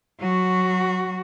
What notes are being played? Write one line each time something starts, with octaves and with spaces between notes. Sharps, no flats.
F#3 F#4